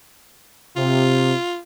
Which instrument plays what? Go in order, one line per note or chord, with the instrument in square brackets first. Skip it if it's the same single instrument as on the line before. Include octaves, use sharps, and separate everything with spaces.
[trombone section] C3 [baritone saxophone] F4